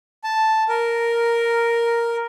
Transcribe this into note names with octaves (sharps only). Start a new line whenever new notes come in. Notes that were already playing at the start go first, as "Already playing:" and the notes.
A5
A#4